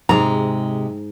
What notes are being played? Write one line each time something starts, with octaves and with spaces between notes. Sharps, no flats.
G#2 C3 G#3 A#5